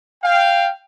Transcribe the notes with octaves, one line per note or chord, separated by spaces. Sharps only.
F5 G5